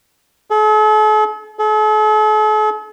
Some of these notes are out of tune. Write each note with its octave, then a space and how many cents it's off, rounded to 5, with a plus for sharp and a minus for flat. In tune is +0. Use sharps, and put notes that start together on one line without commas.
A4 -45
A4 -45